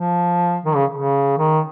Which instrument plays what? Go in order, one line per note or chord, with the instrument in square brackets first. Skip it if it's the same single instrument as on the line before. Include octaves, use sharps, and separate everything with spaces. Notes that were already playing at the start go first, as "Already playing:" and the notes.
Already playing: [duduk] F3
D#3
C#3
C#3
D#3